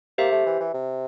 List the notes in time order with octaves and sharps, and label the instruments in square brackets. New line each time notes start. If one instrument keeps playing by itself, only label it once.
[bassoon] A#3 [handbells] G4 C5 E5
[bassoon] A3
E3
E3
C3